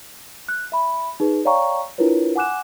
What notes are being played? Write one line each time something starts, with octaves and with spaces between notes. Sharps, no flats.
F#6
E5 B5
D#4 G#4 B4
C#5 D5 F5 G5 A#5 C#6
D4 E4 F4 A#4 B4 C#5
F#5 G#5 D6 F#6 E7